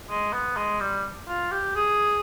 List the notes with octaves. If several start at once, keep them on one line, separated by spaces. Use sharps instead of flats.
G#3
B3
G#3
G3
F4
G4
G#4